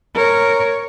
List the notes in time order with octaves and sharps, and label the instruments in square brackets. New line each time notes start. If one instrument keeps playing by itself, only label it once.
[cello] A#4 C#5